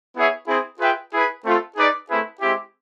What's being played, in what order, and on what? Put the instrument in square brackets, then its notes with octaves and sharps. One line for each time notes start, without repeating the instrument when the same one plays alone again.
[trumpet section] B3 E4 G#4 C#5 E5
C4 E4 G#4
F4 G#4 B4 E5 G5
E4 G#4 B4
A3 C4 F4 A4
D#4 G#4 B4 D5
A3 C4 E4 G#4 B4
G#3 C4 E4 G4